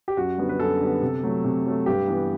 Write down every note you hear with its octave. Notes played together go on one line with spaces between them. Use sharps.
G4
F#2 F#4
D3 G3 B3
B4
F#2 A4
D3 G3 B3
C3
F#3 A3
C3
F#3 A3
G2 G4
E3 B3